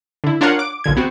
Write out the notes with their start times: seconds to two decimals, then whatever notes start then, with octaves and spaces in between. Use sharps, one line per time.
0.24 D3 E4
0.41 D4 F4 A#4 C#5 F5 F#5
0.59 D6
0.84 B1 A#2 D3 G#6
0.97 B3 C4 F#4